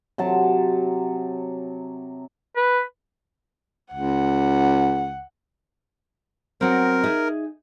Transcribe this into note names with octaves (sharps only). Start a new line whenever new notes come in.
C3 F#3 A5
B4
C#2 F#5
F#3 C4 A#4
D#4 G#4 E5